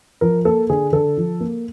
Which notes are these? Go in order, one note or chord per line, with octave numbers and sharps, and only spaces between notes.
F3 A#4
A#3 A4
D3 G#4
D3 A4
F3
A#3